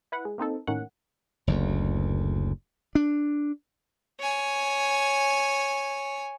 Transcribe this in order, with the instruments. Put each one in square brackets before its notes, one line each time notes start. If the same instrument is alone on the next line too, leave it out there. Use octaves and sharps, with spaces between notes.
[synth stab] E4 B4 F#5
G#3
A#3 C4 D#4 A4
A2 D#3 A#3 C#4 F#5
[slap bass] F#1 D2
D4
[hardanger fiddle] C#5 G#5